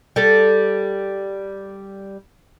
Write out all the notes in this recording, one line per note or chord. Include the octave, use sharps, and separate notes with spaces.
G3 A4